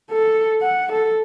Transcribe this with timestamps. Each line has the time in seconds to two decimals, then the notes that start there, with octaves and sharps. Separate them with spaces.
0.11 A4
0.62 F#5
0.93 A4